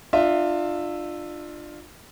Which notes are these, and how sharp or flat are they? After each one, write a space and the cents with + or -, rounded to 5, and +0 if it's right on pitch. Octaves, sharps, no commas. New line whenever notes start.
D4 +35 F4 +0 E5 +0